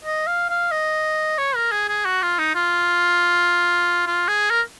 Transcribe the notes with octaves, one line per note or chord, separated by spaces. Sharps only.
D#5
F5
F5
D#5
C#5
A#4
G#4
G#4
F#4
F4
D#4
F4
F4
G#4
A#4